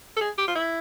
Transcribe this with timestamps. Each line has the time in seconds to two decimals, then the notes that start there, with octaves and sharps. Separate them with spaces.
0.17 A4
0.21 G#4
0.38 G4
0.48 F4
0.56 E4